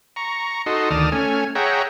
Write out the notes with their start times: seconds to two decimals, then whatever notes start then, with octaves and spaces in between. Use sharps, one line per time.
0.16 A#5 C#6
0.66 D#4 F#4 A4 D#5 C6
0.91 D2 D#3 D5 A5 D#6 F6
1.12 A3 C#4 G#5 F6
1.55 G#4 C#5 E5 F#5 G5 A#5